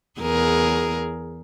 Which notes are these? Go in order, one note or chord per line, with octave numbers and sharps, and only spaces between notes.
E2 G#4 A#4